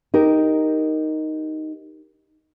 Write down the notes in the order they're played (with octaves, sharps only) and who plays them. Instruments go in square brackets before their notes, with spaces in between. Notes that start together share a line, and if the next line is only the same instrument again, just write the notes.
[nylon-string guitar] D#4 G4 A#4